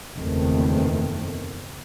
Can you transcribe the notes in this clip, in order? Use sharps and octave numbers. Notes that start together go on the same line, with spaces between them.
F#1 E2 B2 D#3 A3 C4